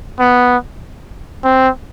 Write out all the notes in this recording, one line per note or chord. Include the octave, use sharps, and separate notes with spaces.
B3
C4